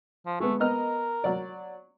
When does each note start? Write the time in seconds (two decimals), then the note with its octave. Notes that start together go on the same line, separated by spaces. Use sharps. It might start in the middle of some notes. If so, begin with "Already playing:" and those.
0.26 F3
0.40 G#3 A3 B3
0.60 B3 A#4 D#5 F6
1.24 F#3 D5